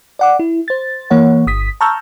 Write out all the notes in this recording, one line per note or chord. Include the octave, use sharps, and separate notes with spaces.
D5 F#5 D6
E4
C5 A6
E3 A#3 C#5 F#5
G1 D#6 B6
A5 A#5 C#6 E6 F6 G6